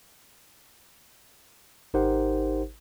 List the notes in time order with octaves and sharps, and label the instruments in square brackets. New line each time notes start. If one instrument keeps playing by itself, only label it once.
[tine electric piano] G#1 D#4 G4 A#4 C5 F#5